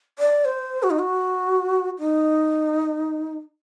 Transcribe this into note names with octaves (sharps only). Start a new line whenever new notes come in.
D5
C5
F#4
D#4
F#4
D#4